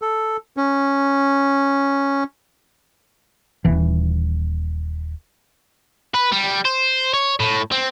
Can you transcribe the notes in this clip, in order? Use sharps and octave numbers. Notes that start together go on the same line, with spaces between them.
A4
C#4
D#1 E3
B4
G3
C5
C#5
A2
C4